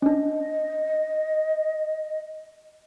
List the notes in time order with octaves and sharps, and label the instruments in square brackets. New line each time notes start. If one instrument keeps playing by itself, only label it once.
[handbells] C#4 D4 [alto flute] D#5